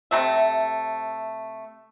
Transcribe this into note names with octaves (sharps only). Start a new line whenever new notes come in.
C3 A3 E5